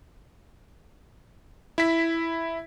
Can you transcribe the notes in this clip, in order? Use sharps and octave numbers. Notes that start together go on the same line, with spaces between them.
E4 B6